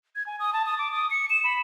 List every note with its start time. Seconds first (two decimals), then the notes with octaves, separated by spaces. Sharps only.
0.16 G#6
0.27 G#5
0.40 D#6
0.53 A5
0.66 D#6
0.78 D6
0.92 D#6
1.11 C#7
1.30 E7
1.44 B5